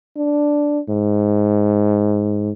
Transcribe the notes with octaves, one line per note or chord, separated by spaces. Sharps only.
D4
G#2